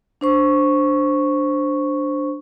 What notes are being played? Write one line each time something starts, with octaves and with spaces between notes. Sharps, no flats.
D4 C5 C#6